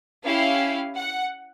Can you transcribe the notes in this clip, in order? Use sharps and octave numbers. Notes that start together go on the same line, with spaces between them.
C#4 E4 G4 F5
F#5